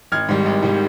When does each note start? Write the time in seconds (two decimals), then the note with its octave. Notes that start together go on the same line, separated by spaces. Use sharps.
0.12 G#1 F6 G#6
0.29 G#2 D#3 G3
0.46 G#1
0.63 G#2 D#3 G3